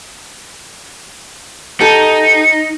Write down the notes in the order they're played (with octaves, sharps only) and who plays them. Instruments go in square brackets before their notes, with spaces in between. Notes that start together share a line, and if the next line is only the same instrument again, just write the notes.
[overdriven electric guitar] D#4 [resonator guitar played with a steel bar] G4 A4